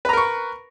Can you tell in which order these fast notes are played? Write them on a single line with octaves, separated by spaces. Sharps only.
B4 A#5 A#4 C#6